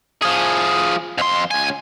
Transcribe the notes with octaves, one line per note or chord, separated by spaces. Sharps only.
F3 G#4
F2 C6
C#2 G#5